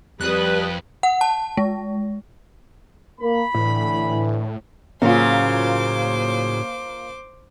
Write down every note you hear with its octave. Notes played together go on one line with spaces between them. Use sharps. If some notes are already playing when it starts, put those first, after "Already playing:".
F2 G3 B4 D#6 F#6
F#5
A5
G#3
A#3 B5
A2 D3 E3
A2 C#3 F#3 A#3 F4 C5 D6